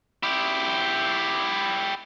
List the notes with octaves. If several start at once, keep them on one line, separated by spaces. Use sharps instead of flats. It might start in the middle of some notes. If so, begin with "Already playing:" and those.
E4 G4